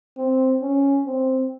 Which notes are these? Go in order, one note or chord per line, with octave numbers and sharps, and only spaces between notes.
C4
C#4
C4